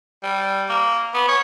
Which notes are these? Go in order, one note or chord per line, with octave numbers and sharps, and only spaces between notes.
G3
A#3
B3
C#5